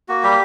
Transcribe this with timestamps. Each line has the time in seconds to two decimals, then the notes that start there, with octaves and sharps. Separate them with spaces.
0.08 A#3 F#4
0.23 G3 G4